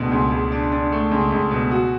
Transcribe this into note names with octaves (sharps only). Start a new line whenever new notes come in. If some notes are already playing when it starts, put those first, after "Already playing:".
Already playing: C#2 B2 A3 D4
C#2
C#2
D4
D4
A3
C#2
C#2
B2
F#4